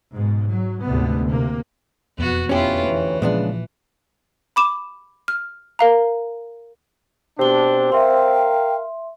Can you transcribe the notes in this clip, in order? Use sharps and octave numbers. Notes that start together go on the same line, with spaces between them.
G#2 B2
F#3
D2 G#2 C3 B3
C3 A#3
E1 F2 B3 F#4
D2 B3 C#4 E4 F4 G4 B4 C#5
E3
A#2 C#3 F3 G#3 B3 D4
B5 D6 E7
F6
A#4 F5 A#5
B2 C4 D4 G4 G7
A#4 E5 F5 G5 C6